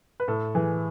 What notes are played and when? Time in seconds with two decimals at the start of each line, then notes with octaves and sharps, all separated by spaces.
0.20 B4
0.28 A2 A4
0.55 E3 G#4